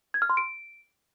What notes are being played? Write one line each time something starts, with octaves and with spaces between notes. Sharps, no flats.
G#6
F6
C6
D7